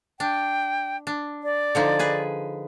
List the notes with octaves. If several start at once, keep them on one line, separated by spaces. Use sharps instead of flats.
D4 G5
D4
D5
D3 F3 D#4
G#4 B4